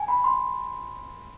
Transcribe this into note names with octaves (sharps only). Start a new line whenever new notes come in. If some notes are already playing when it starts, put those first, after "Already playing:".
Already playing: G#5
B5
C6